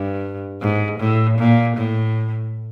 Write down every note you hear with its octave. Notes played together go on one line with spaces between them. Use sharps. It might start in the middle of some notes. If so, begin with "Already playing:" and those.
Already playing: G2
G#2
A2
A#2
A2